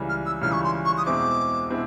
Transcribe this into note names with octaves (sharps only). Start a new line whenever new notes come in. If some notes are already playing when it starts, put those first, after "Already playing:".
Already playing: C#2 C#3 E3 G3
F6
E6
C#2 C#3 E3 G3 F6
C#6
C6
C#6
D#6
E2 B2 G#3 C4 E4 D6
B2 G#3 C4 E4